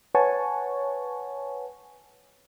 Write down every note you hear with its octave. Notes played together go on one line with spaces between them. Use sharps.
B4 C#5 F#5 G#5 A5 C#6